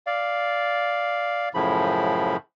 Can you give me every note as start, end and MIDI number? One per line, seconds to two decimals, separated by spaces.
0.07 1.49 74
0.07 1.49 77
1.54 2.37 42
1.54 2.37 45
1.54 2.37 49
1.54 2.37 53
1.54 2.37 83